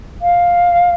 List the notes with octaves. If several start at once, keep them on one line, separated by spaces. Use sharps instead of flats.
F5